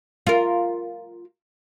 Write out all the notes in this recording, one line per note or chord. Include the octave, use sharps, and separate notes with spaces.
F4 A#4